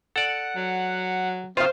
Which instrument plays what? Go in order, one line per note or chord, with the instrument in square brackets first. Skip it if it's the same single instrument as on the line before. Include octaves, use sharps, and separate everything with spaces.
[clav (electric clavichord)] A4 D5 [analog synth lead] F#5
[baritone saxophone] F#3
[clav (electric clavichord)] D#3 F4 [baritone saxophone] C4 [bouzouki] C5 F5